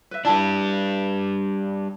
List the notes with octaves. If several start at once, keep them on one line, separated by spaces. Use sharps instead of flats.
B4 E5
G3 D4 E4 A5 B5